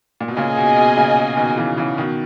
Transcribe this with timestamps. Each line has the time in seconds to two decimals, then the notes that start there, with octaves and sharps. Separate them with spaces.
0.20 A#2
0.28 B2
0.37 A#2 C#3 G#4 D#5 G#5
0.57 B2
0.76 B2
0.97 A#2 C#3
1.37 B2 D#3
1.57 C#3 E3
1.77 C#3 E3
1.98 B2 D#3